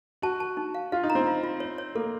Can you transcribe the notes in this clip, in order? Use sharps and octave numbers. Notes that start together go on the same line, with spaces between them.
F#4 A5
A5
D#4
F5
F4 F5
D#4
A#5
C4
F4
F4
C#5
C#5
A#3 A4